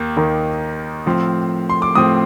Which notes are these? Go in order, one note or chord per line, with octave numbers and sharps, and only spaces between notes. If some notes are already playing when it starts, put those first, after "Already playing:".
Already playing: D#2 A#3
D#2 D#3 A#3
A2 F3 C4
C6
D6
A2 F3 C4 D#6